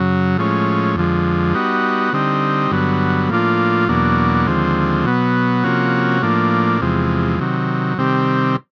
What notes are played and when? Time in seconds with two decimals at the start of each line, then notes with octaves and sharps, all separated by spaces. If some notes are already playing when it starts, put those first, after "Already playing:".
Already playing: F#2 C#3 F#3
0.37 A2 F3 G#3 C#4
0.95 F2 D3 F3 G#3
1.54 G3 B3 D#4 F#4
2.13 D3 G3 C4 D#4
2.71 G2 D3 F#3 B3
3.29 A2 F3 A#3 D4 F4
3.88 E2 B2 F#3 A#3 D4
4.47 D#2 D3 F3 G#3 C4
5.05 B2 F#3 B3
5.64 C3 F3 A#3 C#4 F#4
6.22 A2 F3 A#3 D4
6.81 E2 C3 F3 G#3
7.39 C3 D#3 F#3
7.98 C3 D#3 G3 C4